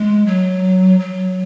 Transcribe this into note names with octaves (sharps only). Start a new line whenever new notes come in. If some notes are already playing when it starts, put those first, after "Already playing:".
Already playing: G#3
F#3
F#3